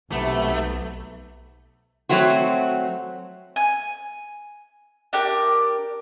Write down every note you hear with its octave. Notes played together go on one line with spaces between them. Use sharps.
B1 C3 A3 B3
F#3 A3 C4 F#4
G#5
D4 G4 A#4